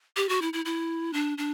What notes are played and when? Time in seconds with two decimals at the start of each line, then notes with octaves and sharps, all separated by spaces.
0.16 G4
0.29 F#4
0.42 E4
0.53 E4
0.65 E4
1.13 D4
1.38 D4